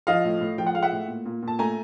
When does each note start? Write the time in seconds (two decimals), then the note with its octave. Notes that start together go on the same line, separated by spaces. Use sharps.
0.07 F3 D#5 F5
0.25 A2
0.41 A2
0.58 F3 G5
0.67 F#5
0.75 G#3 F5
0.83 E5 F#5
0.92 A2
1.08 A#2
1.25 A#2
1.43 A#2
1.48 A5
1.59 A3 G#5 A#5